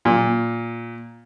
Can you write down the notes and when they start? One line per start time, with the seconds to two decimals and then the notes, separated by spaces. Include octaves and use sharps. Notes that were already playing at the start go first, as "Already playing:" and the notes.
0.05 A#2